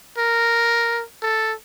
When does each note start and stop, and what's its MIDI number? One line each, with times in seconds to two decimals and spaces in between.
0.18 1.03 70
1.22 1.54 69